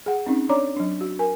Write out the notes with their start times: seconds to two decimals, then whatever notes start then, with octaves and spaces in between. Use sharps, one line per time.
0.06 G#4 F#5
0.26 C4 C#4 D#4
0.49 D4 C#5 D5 A#5 D6
0.77 F#3 D4
1.01 F#4
1.19 A#4 G#5